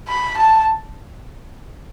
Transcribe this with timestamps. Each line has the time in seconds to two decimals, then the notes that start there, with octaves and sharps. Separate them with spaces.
0.08 B5
0.37 A5